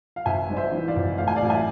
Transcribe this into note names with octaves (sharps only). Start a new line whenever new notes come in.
F5
G#1 E5 G#5
G#2 D5
C5 E5
E3
D5 F5
G#1
A2 F5
G#5
D5 F5
A1
E5 G#5